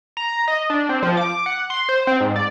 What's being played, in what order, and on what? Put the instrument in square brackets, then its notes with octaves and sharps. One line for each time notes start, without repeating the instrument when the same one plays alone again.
[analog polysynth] A#5
D#5
D4
C4
F3
D6
F#5
C6
C5
C4
G#2
D5